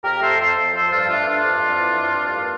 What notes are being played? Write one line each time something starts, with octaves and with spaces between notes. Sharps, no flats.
F2 G4 A#4
A3 A4 C5
F2 A4 C5
F2
F3 A4 C5
G2 F4 A4
A3 D4 F4
G2 D4 F4
F2
F2
E3
F2
G2
A#3